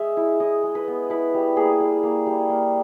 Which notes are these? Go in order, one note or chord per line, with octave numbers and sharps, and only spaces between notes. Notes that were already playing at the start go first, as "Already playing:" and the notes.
Already playing: G#3 E5
E4
E4 D#5
G#3
B4
B3
E4 B4
G3
A#3 G#4
G3
A#3
G3
A#3